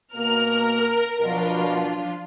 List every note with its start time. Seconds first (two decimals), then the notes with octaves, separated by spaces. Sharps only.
0.15 B2 A#3 A#4 F6
1.21 B2 F3 F#3 D4 F4